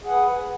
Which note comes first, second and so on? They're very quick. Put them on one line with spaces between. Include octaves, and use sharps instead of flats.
G#4 F#5 B4